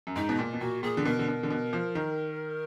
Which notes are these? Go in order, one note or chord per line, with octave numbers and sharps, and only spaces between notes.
F#2
G#2 D#4
B2
A#2
B2
A#2 F#4
A#2 G#4
D3
B2 A#4
D3
B2
D3
B2
F3
D#3